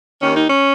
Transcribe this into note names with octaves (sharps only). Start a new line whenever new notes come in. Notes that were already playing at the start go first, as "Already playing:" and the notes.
D#2 D#3 C#4
D#4
C#4